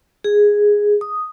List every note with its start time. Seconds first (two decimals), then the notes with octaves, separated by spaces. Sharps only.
0.24 G#4
1.01 D#6